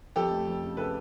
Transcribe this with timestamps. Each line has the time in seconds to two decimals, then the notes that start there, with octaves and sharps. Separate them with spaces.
0.16 F2 G4 A4
0.31 A3
0.47 F2
0.63 C#3
0.77 C#3 A4 B4